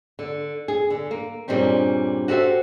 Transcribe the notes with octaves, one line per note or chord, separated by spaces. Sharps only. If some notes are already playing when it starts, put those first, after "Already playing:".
D3
G#4
D3
A#3
G2 A#2 G3 G#3 C4 C#4
F#4 G4 A4 C5 D#5 E5